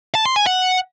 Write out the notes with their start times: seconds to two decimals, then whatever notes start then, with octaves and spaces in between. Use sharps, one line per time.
0.15 A5
0.26 C6
0.36 G#5
0.47 F#5